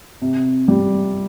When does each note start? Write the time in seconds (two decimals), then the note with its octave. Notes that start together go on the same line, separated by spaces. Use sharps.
0.22 C3
0.68 G3